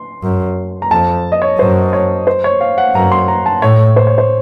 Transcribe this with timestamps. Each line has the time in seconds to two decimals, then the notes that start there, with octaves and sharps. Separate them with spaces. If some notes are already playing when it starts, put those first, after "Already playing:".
Already playing: C6
0.23 F#2
0.82 A#5
0.91 F2 A5
1.32 D#5
1.42 C#5
1.59 F#2 C5
1.93 C#5
2.27 C5
2.44 C#5
2.61 F5
2.78 F#5
2.95 F#2 A#5
3.12 C6
3.28 A#5
3.46 A5
3.62 A2 C#5
3.96 C5
4.07 C#5
4.18 C5